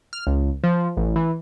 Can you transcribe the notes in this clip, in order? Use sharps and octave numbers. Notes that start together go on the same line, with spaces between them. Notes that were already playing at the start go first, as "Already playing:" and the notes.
F6
C#2
F3
A1
E3